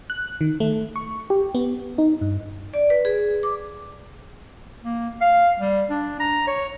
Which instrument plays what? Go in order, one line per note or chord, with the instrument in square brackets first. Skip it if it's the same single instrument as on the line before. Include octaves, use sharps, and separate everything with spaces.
[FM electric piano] F#6
D#3
A3
C#6
G4
B3
D#4
G2
[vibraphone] D5
B4
G#4
D6
[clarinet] A#3
F5
G3
D4
A#5
C#5